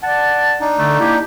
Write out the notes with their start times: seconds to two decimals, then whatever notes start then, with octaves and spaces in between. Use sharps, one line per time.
0.03 D5 F#5 A5
0.61 D4 D#4
0.78 D3 A3
1.00 A#3 E4 G4